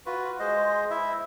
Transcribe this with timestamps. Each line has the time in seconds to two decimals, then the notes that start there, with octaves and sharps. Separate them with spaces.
0.06 F4 F#4 B4
0.39 G#3 C5 D#5
0.90 E4 E5